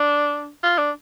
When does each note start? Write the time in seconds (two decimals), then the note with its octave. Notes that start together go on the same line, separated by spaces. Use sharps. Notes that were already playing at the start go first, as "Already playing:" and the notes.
Already playing: D4
0.63 F4
0.78 D4